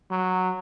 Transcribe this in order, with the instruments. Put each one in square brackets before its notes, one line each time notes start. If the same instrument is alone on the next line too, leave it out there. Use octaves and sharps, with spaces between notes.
[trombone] F#3